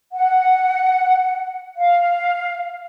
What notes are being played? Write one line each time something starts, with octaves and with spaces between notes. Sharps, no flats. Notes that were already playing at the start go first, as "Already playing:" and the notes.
F#5
F5